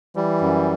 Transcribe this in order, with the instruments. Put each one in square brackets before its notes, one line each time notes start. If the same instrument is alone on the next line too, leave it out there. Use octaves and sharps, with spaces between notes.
[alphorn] E3 [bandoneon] G3
[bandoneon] F#2